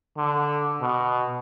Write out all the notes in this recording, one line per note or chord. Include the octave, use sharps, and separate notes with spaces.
D3
B2